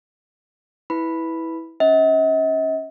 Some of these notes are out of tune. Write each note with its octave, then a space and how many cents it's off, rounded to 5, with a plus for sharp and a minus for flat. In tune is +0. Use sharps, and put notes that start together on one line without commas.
E4 -15 B4 +0 B5 +0
C#4 +0 D#5 +45 F#5 +10